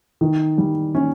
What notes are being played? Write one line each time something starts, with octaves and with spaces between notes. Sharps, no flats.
D#3
G3
C#4